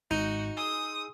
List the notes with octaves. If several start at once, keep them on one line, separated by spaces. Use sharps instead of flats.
G#1 D#4 F#4 G6
G#4 C6 D#6 E6